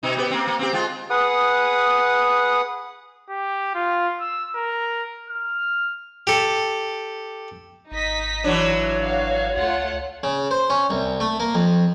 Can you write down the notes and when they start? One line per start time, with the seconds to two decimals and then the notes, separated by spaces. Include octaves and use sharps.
0.03 B2 D#4
0.17 B3 G4
0.31 A#3 C4
0.47 A#3
0.59 C4 G4
0.73 G#3 F4
1.10 G#4 B4 F#5 D#6
3.30 G4
3.75 F4
4.20 E6
4.56 A#4
5.30 F6
6.27 G4 A4
7.92 G#1 D#4 D#5 B6
8.44 E3 F#3 D4 C#5
8.99 F#4 F5
9.56 C#2 A3 F4 F#5
10.23 C#3
10.51 C5
10.70 C#4
10.90 C2
11.20 A3
11.40 A#3
11.55 F2